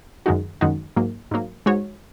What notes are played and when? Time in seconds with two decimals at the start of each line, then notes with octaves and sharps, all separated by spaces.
0.26 F#2 D#3 G#3 D#4 F#4
0.61 F#2 D#3 G#3 D#4 F#4
0.96 G#2 F#3 A#3
1.31 G#2 F#3 A#3
1.66 G#2 G#3 F#4 C#5